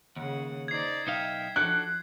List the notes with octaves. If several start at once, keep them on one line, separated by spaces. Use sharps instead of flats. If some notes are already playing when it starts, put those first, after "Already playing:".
D#2 C#3 F#5
D#4 C5 D5 G#6 C7
B1 D#4 E5 F5 G5
F3 D4 F#4 A4 F#6